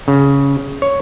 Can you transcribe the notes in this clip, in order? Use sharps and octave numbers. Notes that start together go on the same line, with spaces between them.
C#3
C#5